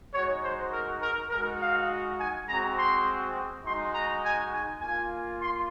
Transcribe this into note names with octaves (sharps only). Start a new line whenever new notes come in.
G#3 D#4 F#4 C#5
C5
A#4
A#4
G#3 D#4 F#4 A#4
F5
G#5
G#3 C4 F#4 A#5
C6
G#3 D#4 F#4 C6
A#5
G#5
G#5
A#3 F4 G#5
C6